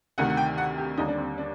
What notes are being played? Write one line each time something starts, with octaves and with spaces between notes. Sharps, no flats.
D2 C3 D#3 F#5
F#5
G5
F#5
G4
D#2 D3 G3 D#4
D4
C4
D4